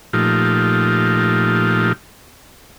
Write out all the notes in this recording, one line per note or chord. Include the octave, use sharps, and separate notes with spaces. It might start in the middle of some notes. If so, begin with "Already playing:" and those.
A#2 F3 A3 D#4 F4 G4